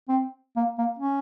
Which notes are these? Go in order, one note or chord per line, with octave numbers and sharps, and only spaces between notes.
C4
A#3
A#3
C#4